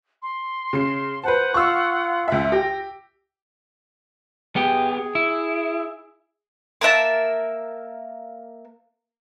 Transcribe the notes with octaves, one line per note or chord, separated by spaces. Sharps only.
C6
C#3 C7
B4 C5 F#5 A5
F4 C#6 E6
C#2 E5
G4 A#6
B3 G4 G#4
E4
A#3 A#4 E5 A5